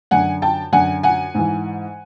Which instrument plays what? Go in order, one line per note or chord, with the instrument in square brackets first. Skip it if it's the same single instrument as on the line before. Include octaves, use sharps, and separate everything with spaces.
[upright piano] F#2 D3 F#5 G#5
G5 A5
F#2 D3 F#5 G#5
F#5 G#5
G#2 E3